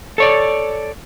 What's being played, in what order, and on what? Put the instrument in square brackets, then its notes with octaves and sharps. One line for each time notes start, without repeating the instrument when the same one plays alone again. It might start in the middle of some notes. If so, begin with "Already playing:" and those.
[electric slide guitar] A4 C#5 D5